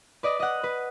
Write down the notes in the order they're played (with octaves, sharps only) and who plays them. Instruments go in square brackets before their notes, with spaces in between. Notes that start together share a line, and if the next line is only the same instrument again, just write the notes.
[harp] B4 D5 D#5
D#5 F#5
B4